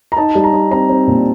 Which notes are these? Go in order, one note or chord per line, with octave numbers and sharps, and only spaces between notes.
A#5
D#4 A5
G3
A#5
D#4
C4 A#5
C4
A#2